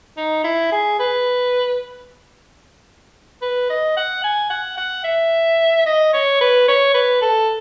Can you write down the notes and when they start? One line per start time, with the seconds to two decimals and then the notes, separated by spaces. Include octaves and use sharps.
0.17 D#4
0.44 E4
0.72 G#4
0.99 B4
3.42 B4
3.70 D#5
3.97 F#5
4.24 G#5
4.50 F#5
4.77 F#5
5.04 E5
5.86 D#5
6.13 C#5
6.41 B4
6.68 C#5
6.94 B4
7.21 A4